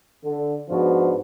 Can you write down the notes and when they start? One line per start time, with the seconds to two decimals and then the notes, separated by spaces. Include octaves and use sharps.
0.25 D3
0.69 G#2 F3 B3 D4 F#4